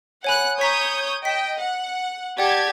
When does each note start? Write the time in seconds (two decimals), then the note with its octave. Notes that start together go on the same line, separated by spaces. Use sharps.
0.24 C#5 F#5 G#5 B5 F#6
0.61 C#5 A#5 D#6 G6 B6
1.25 D#5 G5 B6 E7
1.59 F#5
2.38 G4 D5 F#5 A5 G#6